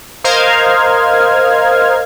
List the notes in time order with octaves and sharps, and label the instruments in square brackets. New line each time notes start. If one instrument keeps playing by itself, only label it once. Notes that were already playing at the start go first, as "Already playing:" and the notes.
[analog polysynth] A#4 C5 D#5 F5 F6 G#6